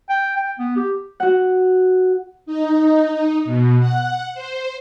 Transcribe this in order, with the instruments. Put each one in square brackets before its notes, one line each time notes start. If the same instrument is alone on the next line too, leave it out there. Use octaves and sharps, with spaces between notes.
[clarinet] G5
G5
B3
G4
[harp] F#4 F#5
[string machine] D#4
B2
F#5
C5